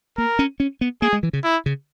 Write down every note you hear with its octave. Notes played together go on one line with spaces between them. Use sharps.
A#3 A#4
C#4
C#4
B3
A#3 G#4
G#3
E3
C#3
E4
C#3